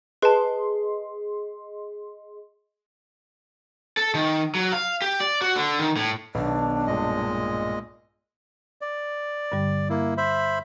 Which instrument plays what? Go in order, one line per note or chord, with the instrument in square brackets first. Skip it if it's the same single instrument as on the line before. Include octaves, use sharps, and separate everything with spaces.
[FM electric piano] G#4 D#5 C6 [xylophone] B4 A5
[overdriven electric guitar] A4
D#3
F#3
F5
G4
D5
F#4
D3
D#3
A2
[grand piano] B1 [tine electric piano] D#3 B3 [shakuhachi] D4
[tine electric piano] G2 [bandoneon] A#2 G#3 D#5
[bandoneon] D5
[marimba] G2 D3 G3
[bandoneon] A#3 E4
C5 E5 B5